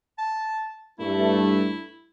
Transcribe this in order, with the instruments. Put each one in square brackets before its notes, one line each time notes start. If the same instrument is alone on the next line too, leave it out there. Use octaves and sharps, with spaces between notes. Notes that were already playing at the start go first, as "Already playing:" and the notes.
[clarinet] A5
[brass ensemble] G2 A3 [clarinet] E4